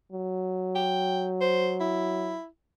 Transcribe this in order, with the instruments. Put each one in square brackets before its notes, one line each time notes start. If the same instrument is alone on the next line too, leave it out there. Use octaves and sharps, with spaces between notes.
[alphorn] F#3
[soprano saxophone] G5
C5
E4